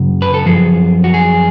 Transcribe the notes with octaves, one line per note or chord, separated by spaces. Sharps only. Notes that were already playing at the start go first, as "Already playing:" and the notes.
Already playing: F#2 C#3
B4
A4
F#2 F3 G#4
F#4
G#4